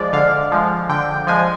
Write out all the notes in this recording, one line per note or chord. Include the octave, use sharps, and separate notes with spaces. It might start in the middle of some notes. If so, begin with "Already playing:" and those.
Already playing: F3 G#3 D5
D3 F5
F3 G#3
D3 G5
F3 G#3 G#5